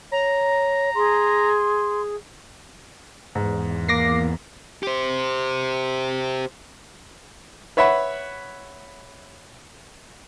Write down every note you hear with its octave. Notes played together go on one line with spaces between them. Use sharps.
C#5 A#5
G#4 C6
E2 G#2
A#3 D6 A#6 C7
G4 C5
B4 C#5 E5 F#5 B5